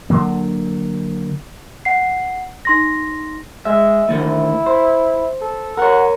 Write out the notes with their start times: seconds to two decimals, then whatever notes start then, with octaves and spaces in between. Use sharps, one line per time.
0.10 D3 F#3 A#3
1.85 F#5 C7
2.65 D#4 C6 A#6
3.65 G#3 E5
4.09 D3 D#3 A3 E4
4.66 C5
5.41 A4
5.77 A#4 C#5 F#5